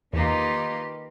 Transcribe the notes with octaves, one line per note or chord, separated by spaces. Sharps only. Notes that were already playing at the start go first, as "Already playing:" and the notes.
E2 D#3 A#3 D#4 F4 G4 B4